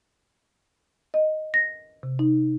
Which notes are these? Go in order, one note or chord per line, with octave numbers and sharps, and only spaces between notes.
D#5
A#6
C3
D#4